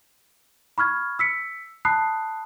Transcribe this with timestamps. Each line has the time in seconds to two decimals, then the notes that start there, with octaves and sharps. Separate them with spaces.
0.78 B5 C#6 F6 G#6
1.19 E6 B6 C#7
1.85 A5 B5 D#6 F#6 C7